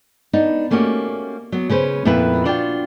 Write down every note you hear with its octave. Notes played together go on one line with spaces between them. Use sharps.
B3 D4 D#4
A3 A#3 C#4 D#4 F#4 G4
F#3 B3
C#3 C#4 B4 C5
F2 A#2 B3 E4 B4
D4 F4 F#4 F#5 G5